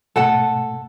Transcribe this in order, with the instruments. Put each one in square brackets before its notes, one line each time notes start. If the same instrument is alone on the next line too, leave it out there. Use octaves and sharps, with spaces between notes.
[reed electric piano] G#2 B2 A3 [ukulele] A4 F#5 A5